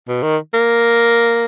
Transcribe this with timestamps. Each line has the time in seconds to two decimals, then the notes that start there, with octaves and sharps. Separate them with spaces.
0.08 B2
0.23 D#3
0.54 A#3